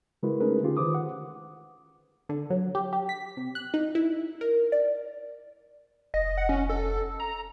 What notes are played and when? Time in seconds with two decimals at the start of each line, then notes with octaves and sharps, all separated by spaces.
0.23 C#3 G#3 E4 F#4 A#4 B4
0.40 A3 C#4 D#4 G#4 A#4 B4
0.63 D3 C#4 F4 G4 G#4
0.77 D#3 B4 C5 D6 D#6
0.94 F#5
2.29 D3
2.50 F#3
2.75 G4
2.93 G4
3.09 B6
3.37 C3
3.55 F#6
3.74 D#4
3.95 E4
4.41 A#4
4.72 D5
6.14 F1 D#5
6.37 F#5
6.49 C#4
6.70 A4
7.20 A#5